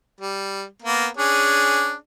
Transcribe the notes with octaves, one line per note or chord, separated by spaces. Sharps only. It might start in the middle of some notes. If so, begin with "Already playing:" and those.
G3
A#3 B3
C#4 D4 G#4